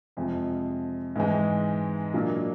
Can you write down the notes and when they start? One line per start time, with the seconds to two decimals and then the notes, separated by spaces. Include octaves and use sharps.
0.17 F2 C3 F3 G#3
1.16 G#2 E3 G#3
2.14 A#2 F#3 A#3 D4